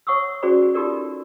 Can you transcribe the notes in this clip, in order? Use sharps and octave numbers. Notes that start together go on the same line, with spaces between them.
C#5 F#5 C#6 D#6 E6
C#4 F#4 G#4 C5 D5 B5
D#4 F4 G4 A4 A#4 D5